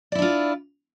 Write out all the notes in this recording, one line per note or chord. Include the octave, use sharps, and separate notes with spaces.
D4 E4 F4 D5